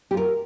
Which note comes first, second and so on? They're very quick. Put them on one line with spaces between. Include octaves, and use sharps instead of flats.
G4 F4 A#4